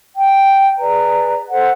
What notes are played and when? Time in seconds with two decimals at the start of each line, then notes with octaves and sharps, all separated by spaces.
0.16 G5
0.78 G#4 B4 D5 A#5
1.49 A4 C5 F#5